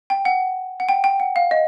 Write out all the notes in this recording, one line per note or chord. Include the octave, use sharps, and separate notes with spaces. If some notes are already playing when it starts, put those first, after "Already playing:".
G5
F#5
F#5
G5
G5
F#5
F5
D#5